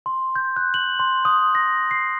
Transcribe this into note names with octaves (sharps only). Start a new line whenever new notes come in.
C6
G6
F#6
F#7
C6
D#6
A#6
C7